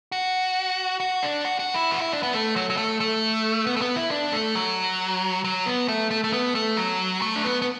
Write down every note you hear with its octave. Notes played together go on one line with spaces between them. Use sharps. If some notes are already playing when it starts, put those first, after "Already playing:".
F#4
F#4
D4
F#4
F#4
E4
F#4
E4
D4
B3
A3
F#3
F#3
A3
A3
B3
A3
B3
E4
D4
A3
F#3
F#3
B3
A3
A3
A3
B3
A3
F#3
A3
D4
B3
B3